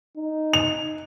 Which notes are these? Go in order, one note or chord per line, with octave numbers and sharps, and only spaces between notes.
D#4
F7